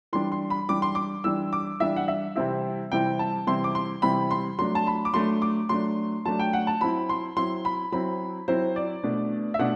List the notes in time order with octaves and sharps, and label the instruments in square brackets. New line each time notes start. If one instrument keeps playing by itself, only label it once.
[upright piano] E3 G3 D4 C6
C6
B5
E3 G3 D4 D6
C6
D6
E3 G3 D4 E6
D6
E3 G3 D4 E5
F#5
E5
C3 E3 G3 C4 E4 E5
C3 E3 G3 C4 E4 G5
A5
C3 E3 G3 C4 E4 C6
D6
C6
C3 E3 G3 C4 E4 B5
C6
F#3 A3 D4 C6
A5
B5
D6
F#3 A3 D4 C6
D6
F#3 A3 D4 C6
F#3 A3 D4 A5
G5
F#5
A5
F#3 C4 E4 B5
C6
F#3 C4 E4 C6
B5
F#3 C4 E4 B5
F#3 C4 E4 C5
D5
B2 A3 D4
E5
B2 A3 D4 F#5